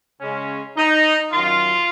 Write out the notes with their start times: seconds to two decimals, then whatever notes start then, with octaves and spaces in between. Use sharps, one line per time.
0.21 C#3 G#3 C#4
0.77 D#4
1.32 F#2 D#3 F#3 F4